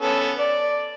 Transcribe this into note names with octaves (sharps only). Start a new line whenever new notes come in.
B3 C#4 A4
D5